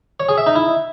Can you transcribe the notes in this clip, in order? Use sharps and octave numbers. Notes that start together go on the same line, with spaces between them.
C#5
G#4
E5
D#4
E4